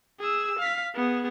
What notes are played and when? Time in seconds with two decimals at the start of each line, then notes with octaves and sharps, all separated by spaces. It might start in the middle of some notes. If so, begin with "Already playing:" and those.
0.20 G#4 E6
0.59 F5 B6
0.95 B3 G#4